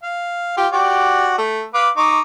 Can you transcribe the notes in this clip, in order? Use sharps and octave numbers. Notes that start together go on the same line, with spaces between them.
F5
F4 G4
F#4 G4 D5
A3
B4 F5 D6
D#4 C#6 D6